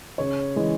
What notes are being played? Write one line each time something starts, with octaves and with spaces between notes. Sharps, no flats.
C#3 C#5
E3 G#3